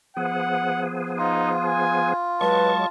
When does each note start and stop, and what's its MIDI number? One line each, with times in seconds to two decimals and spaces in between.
0.17 2.13 53
0.17 2.13 59
0.17 2.13 68
0.17 0.86 78
1.18 1.53 63
1.18 2.88 65
1.65 2.13 80
2.41 2.86 54
2.41 2.86 56
2.41 2.71 71
2.41 2.87 81
2.41 2.86 85